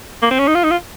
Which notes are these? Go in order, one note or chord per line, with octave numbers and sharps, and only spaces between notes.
A#3
C4
C#4
D#4
F4
D#4
F4